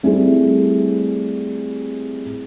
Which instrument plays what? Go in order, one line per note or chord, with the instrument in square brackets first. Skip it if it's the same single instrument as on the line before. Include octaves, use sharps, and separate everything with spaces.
[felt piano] G3 A3 C4 E4 G#4